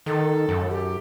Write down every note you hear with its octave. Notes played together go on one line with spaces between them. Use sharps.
D#3 A4
F#2
G4